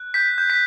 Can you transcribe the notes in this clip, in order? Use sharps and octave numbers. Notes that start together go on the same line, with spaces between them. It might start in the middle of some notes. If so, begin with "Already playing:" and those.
Already playing: F#6
G6 B6
G6
B6